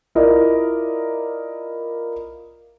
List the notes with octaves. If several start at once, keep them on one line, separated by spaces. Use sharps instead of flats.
E4 F4 A#4 D5 D#5